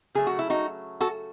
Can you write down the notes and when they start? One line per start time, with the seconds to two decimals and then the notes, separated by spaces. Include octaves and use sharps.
0.15 C#3 F#3 A3 G#4
0.27 F#4
0.39 E4
0.50 D#4 F#4
1.01 F#4 A4